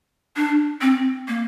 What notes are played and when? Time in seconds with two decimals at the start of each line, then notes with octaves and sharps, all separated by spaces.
0.36 D4
0.81 C4
1.28 A#3